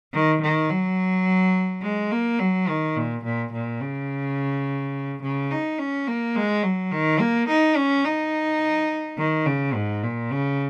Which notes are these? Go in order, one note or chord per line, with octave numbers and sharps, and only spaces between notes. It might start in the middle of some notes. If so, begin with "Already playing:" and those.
D#3
D#3
F#3
G#3
A#3
F#3
D#3
A#2
A#2
A#2
C#3
C#3
D#4
C#4
A#3
G#3
F#3
D#3
A#3
D#4
C#4
D#4
D#3
C#3
G#2
A#2
C#3